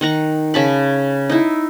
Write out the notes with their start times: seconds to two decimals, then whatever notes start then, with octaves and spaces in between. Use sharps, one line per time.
0.01 D#3 F#5 A#5
0.54 C#3 A5 B5
1.30 D#4 E4